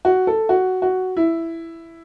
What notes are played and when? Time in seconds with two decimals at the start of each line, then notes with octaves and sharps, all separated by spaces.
0.05 F#4
0.27 A4
0.49 F#4
0.82 F#4
1.17 E4